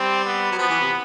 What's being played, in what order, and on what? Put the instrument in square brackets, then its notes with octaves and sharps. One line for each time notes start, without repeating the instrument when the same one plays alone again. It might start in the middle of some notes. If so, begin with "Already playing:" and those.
Already playing: [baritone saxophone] G3 [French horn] C4
[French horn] B3
[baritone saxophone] F#3
[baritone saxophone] F3 [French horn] B3
[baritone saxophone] E3
C3